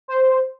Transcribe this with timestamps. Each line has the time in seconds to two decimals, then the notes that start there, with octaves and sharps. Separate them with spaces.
0.08 C5